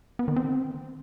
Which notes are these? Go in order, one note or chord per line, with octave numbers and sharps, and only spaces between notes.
B3
D#3
C4